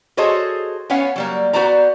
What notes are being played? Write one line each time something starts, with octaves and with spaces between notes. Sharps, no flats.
F#4 G#4 A4 C5 C#5 D#5
B3 C#4 C#5 F5 F#5 G#5
F#3 G3 A#3
B3 F#4 C5 D5 A5 A#5